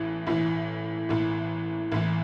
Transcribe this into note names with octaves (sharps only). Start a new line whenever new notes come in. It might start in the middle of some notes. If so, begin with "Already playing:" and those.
Already playing: A1 A2 E3
A1 A2 E3
A1 A2 E3
A1 A2 E3